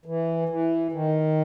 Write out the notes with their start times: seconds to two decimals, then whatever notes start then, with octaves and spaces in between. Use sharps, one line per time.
0.06 E3
0.49 E3
0.92 D#3